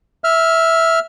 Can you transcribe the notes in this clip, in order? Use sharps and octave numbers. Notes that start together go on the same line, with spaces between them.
E5 F6